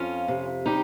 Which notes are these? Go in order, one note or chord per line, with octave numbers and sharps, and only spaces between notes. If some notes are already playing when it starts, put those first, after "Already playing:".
Already playing: F2 C#4 F4
C3
G3 D#4 G4